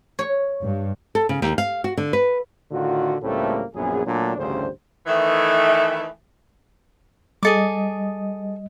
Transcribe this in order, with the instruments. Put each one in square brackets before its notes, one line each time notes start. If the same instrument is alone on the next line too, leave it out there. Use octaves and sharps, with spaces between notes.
[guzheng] C#5
[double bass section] G2
[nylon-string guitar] A4
C#3
D#2
F5
F#4
D3
B4
[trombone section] A2 D3 D#3 F4 F#4
C#2 A2 G3 A3 A#3 C4
A#1 F#2 B3 G#4
A#2 F#3 A3 D4
A1 D2 G2 C#3 C5
[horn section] D#3 E3 A3
[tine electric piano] G3 D#5 [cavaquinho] G#4 A4 D6